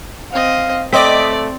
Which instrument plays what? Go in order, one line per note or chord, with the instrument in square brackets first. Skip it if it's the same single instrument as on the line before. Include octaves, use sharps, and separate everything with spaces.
[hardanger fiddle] C4 D#5 [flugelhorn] F5
[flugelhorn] A3 [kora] C4 [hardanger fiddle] D5 [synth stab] D#5 D6 B6